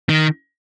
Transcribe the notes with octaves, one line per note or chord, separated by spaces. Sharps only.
D#3